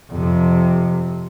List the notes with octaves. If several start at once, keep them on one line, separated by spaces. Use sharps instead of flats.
F2 C3